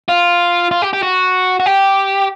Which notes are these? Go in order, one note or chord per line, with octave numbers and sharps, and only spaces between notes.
F4
F4
G4
G4
F#4
F#4
G4